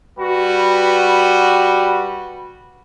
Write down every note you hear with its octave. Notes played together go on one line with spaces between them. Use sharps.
G3 F#4 B4